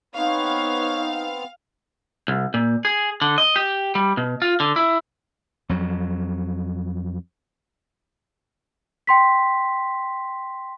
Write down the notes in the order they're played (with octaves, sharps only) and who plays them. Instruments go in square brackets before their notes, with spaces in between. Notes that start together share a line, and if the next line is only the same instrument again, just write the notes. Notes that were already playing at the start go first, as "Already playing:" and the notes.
[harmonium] B3 C4 [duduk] D#4 [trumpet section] B4 C#5 [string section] F5
[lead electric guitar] C2
A#2
G#4
D3
D#5
G4
G3
B2
F4
D3
E4
[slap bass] F2 F#3
[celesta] G5 C6 B6